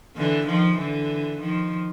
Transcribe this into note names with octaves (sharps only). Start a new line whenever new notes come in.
D3 E3
D#3 F3
D3 E3
D#3 F3